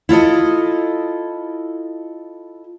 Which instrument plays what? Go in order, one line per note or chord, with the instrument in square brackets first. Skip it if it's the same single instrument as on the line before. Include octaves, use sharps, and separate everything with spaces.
[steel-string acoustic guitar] E4 F4 A4 D#5